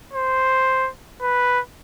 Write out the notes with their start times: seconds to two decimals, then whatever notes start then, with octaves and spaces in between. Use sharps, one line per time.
0.13 C5
1.22 B4